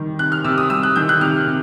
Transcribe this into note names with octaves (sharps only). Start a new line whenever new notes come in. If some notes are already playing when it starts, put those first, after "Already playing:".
Already playing: D#3 G3
C3 F#6
F6
C3 E6
D#6
G3 E6
F#6
D#3 G6
F#6
C3 F6
C3